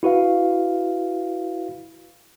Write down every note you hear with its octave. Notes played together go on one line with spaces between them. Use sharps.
E4 F#4 B4 F5